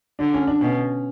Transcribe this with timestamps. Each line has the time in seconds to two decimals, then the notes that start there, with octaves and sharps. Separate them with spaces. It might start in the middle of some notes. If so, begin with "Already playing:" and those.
0.19 D3 D4
0.34 C#4
0.47 D4
0.61 B2 C#4